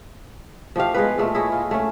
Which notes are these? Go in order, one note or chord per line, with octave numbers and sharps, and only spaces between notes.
F3 A3 G4 F5
G#3 B3 B4
A#2 G#3 A3
E4 G#4 C#5 D#5
F4
A3 C#4